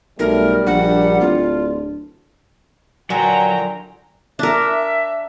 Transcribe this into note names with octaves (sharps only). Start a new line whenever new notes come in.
B1 G3 A3 A#4
A#1 D4 F#5
D1 F4
A#2 D3 E3 F#3 G5 G#5 A#5
D4 A#4 E5